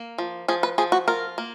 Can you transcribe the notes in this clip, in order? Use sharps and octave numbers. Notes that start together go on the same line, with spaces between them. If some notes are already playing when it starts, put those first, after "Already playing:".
Already playing: A#3
F3
F3 G#4
B4
F3 G#4
F#4
F4 A#4
A#3